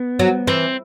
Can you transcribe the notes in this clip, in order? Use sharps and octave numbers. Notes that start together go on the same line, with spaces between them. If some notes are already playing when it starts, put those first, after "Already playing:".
Already playing: B3
F#3
E3 C4